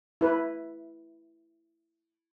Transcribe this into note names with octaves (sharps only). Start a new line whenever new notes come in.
E4 B4